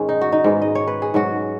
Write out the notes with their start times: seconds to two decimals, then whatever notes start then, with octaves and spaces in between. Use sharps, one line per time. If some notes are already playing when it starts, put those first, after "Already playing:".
Already playing: G#2 D#3 G#3 C#4
0.09 D#4
0.21 F#4
0.32 D#4
0.44 G#2 G#3 B3
0.62 D#5
0.75 C#5
0.87 B4
1.02 G#4
1.14 G#2 F#3 C#4 F#4